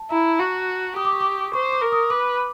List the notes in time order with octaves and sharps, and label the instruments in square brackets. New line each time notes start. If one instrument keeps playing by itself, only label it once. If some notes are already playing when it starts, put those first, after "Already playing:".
Already playing: [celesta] A5
[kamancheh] E4 [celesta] A#5
[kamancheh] F#4 [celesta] C#6
[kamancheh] G4 [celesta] D#6
[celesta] D6
C#6
D6
[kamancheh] C5 [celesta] C#6
[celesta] D6
[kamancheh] A#4
[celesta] D#6
[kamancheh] B4 [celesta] D6